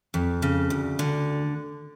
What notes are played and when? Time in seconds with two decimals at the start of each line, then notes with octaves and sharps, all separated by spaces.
0.14 F2
0.42 C#3
0.70 D2
0.99 D3